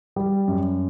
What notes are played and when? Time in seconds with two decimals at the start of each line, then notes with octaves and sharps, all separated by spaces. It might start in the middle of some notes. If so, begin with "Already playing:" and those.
0.16 G3
0.48 F#2